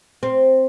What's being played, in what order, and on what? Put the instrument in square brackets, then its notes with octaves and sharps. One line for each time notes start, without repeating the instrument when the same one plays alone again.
[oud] C4